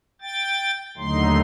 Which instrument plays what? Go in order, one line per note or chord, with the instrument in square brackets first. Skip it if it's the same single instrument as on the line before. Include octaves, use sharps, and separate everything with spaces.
[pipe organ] G5 A6
D#2 D3 F#3 A3 D#4 C6